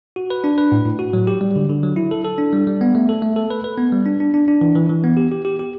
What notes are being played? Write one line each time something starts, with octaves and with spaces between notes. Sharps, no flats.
F#4
B4
D4
B4
A2
A2
F#4
F#3
G4
G3
D3
D3
F#3
E4
A4
A4
D4
G3
G3
B3
A3
A4
A3
A4
B4
B4
B3
G3
D4
D4
D4
D4
E3
E3
E3
B3
G4
G4
G4
G4